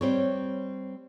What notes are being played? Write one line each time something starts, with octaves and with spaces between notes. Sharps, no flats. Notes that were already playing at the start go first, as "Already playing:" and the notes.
G3 C4 C#5